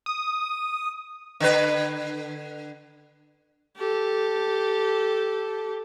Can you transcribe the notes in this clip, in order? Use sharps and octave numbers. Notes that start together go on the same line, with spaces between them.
D#6
D3 B4
G4 A4